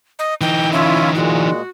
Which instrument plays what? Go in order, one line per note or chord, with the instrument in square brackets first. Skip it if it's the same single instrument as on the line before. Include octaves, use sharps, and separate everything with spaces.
[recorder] D#5
[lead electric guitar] E3 D#4 [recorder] G5
[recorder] C#4 [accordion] E4 F4 E5
[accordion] A#2 G#3 [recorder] F#4